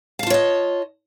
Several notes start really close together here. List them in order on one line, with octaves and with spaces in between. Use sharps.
F5 A5 F4 C#5 D#5